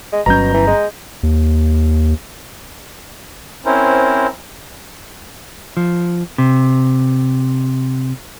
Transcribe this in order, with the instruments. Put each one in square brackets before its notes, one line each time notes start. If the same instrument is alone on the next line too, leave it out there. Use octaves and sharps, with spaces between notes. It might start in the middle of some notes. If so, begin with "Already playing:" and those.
[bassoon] G#3
[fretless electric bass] G1 F#3 C#4 [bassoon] B2 [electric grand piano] A#5 G6
[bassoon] E3
G#3
[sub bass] D#2
[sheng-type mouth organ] C4 C#4 E4 A#4 C5
[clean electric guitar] F3
C3